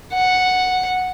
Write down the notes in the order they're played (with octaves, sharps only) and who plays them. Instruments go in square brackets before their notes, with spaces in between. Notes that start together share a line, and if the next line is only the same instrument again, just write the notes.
[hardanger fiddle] F#5